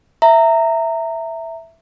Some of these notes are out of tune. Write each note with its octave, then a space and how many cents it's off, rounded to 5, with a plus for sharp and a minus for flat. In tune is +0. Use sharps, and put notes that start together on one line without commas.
E5 +0 A#5 -20